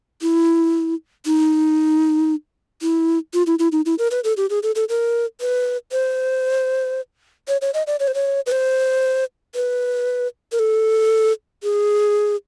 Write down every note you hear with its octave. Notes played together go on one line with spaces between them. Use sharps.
E4
D#4
E4
F4
E4
E4
D#4
E4
A#4
B4
A4
G4
G#4
A4
A4
A#4
B4
C5
C#5
C#5
D#5
D5
C#5
C5
C#5
B4
C5
B4
A#4
A4
G#4